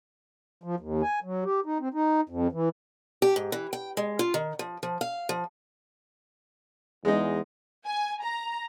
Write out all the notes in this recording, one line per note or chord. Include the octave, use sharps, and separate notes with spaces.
F3
D#2
G#5
F#3
G4
D#4
C4
D#4
F2
E3
G4
G#2
E3
G5
G#3
F4
D#3
F3
F3
F5
F3
E2 G#3 D#4
G#5
A#5